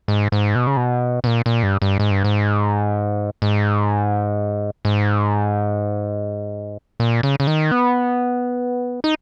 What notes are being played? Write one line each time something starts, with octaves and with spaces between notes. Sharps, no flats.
G#2
G#2
B2
C#3
B2
B2
A#2
A#2
G2
G2
G#2
G2
G#2
G#2
G#2
A#2
C#3
C#3
D#3
B3
D#4